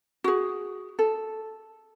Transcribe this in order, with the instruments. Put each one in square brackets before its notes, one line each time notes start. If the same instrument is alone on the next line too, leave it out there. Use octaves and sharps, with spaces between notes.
[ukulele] F#4 G#4
A4